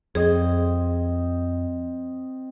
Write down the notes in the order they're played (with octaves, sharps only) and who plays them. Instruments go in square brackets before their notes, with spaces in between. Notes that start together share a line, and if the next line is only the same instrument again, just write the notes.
[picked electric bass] F2 [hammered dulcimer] C4 D#5 [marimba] G#4